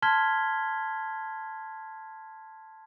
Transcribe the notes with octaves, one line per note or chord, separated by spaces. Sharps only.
A5 C6 F6 G#6 B6 G7